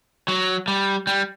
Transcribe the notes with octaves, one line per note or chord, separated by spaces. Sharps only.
F#3
G3
G3